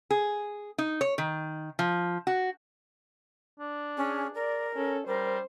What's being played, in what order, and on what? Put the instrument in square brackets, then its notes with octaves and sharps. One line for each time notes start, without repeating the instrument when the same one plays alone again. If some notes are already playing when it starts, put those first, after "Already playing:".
[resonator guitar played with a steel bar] G#4
D#4
C#5
D#3
F3
F#4
[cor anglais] D4
[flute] C#4 [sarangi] G#4
[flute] A#4 [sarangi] D5
[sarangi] C#4 [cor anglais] A4
[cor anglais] G3 [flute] A#4 [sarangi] C5